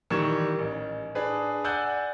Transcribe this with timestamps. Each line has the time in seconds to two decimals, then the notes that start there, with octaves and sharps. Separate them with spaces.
0.10 D#3 E3 G3 C#6 G#6 E7
0.59 A1
1.15 D4 G#4 B4
1.64 D5 F#5 G#5 E6 F#6 G6